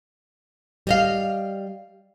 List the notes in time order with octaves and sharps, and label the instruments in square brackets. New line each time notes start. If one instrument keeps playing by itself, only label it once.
[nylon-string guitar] G3 D#5 F5